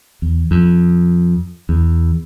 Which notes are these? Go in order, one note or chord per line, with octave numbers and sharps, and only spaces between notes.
E2
F2
E2